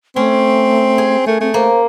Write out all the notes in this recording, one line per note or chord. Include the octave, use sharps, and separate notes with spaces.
A3 C4 C#4
G#4
A3 A#4
A3 C4
A#3 C5